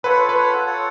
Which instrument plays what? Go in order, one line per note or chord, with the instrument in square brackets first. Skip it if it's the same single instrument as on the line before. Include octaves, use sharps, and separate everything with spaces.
[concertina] F4 A4 C#5 F#5 [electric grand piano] B4
[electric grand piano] B4
[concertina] F4 A4 C#5 F#5